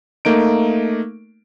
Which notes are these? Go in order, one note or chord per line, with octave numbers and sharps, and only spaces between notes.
A3 A#3 D#4 D7